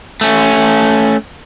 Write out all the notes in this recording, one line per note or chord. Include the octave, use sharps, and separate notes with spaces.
A3 C#4